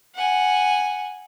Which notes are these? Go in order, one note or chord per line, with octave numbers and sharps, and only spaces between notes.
F#5 G#5